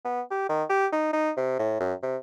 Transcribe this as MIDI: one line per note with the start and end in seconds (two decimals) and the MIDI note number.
0.05 0.22 59
0.31 0.48 67
0.49 0.64 51
0.70 0.87 67
0.92 1.12 63
1.13 1.31 63
1.37 1.57 48
1.59 1.78 45
1.80 1.94 42
2.03 2.17 48